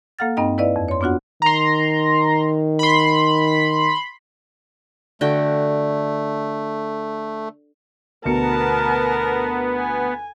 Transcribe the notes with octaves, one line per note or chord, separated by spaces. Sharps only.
A#3 A4 F5 F#5 F6 A6
G2 C4 D#4 D#5 G5 A#5
E4 B4 D5 D#5 F5
F2
C#5 C6
B3 D4 F4 F#4 F#5
D#3 A#5 C6
B5 C6
D3 A3 F#4 G5
D2 B2 B3 A#4 A5 C#7
G#5